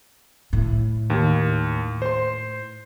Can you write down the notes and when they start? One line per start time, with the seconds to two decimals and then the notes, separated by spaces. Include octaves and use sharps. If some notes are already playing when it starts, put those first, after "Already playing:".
0.53 A2
1.10 D#2
2.02 C5 C6